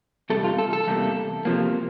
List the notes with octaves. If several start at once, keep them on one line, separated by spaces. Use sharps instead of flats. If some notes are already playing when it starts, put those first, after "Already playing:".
E2 C3 G3 A4
F4
A4
A4
E2 C3 G3 A#3
C3 F3 A#3